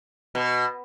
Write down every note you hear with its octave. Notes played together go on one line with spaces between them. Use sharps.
B2